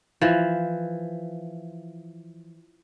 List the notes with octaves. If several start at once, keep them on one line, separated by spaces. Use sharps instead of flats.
E3 F3